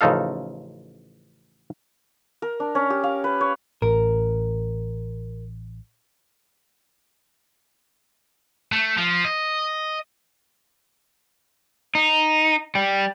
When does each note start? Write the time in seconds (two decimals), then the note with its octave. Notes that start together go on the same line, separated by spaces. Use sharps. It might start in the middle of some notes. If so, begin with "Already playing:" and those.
0.01 A1 C#3 F3 D#4 A4 F5
2.42 A#4
2.60 D4
2.75 C#4
2.90 G4
3.04 F5
3.24 B4
3.41 C#5
3.82 A1 A#4
8.72 A3
8.97 F3
9.25 D#5
11.95 D#4
12.75 G3